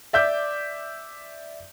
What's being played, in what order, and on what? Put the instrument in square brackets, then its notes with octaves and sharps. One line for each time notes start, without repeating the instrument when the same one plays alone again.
[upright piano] D5 E5 D6 G6